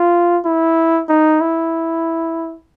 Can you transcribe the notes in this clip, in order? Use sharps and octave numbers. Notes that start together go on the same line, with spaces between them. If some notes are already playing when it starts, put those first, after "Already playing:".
Already playing: F4
E4
D#4
E4